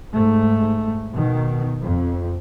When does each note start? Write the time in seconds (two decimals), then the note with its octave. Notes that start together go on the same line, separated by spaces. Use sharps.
0.13 G#2 A3
1.12 B2 D#3
1.81 F2